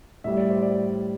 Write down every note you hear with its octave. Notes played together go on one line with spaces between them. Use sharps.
A2 G3 E5
D5
C5
D5